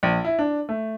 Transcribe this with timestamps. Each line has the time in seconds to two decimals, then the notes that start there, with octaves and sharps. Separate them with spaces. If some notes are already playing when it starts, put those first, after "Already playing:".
0.03 A#1
0.25 E4
0.39 D4
0.69 A3